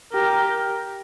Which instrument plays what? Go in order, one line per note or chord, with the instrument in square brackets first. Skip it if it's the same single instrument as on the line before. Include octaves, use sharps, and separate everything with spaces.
[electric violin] G4 [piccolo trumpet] A#4